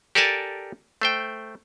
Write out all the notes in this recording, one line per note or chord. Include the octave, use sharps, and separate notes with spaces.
G4 A4 A#4 D5 G#5 A5
A3 C5 G5